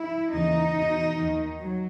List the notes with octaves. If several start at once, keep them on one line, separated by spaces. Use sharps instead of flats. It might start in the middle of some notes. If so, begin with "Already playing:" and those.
Already playing: E4
D#2 C#3 E3 D#4
E2 B2
D#3
D#2
F#3